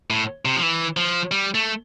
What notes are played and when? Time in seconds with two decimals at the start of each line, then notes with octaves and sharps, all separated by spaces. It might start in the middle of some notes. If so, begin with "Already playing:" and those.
0.10 A2
0.45 C3
0.56 F3
0.62 E3
0.97 F3
1.31 G3
1.55 A3